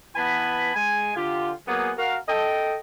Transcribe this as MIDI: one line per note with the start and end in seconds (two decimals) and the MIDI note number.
0.16 0.74 52
0.16 0.74 59
0.16 0.74 80
0.16 0.74 81
0.16 0.74 83
0.75 1.15 56
0.75 1.15 80
1.16 1.52 50
1.16 1.52 65
1.16 1.52 67
1.68 1.91 54
1.68 1.91 58
1.68 1.91 59
1.68 1.91 68
1.98 2.17 66
1.98 2.17 70
1.98 2.17 77
2.28 2.77 69
2.28 2.77 75
2.28 2.77 79